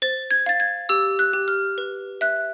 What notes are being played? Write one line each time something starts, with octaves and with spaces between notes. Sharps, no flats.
C5 A6
G#6
F5 A6
G#6
G4 E6
F#6
G4
F6
B4
E5 F#6